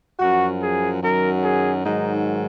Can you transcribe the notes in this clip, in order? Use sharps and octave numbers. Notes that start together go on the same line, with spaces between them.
F#2 F3 F#4
G#4
F#2 D#3 F#3 A#4
G#4
G#2 D#3 F#3 D#4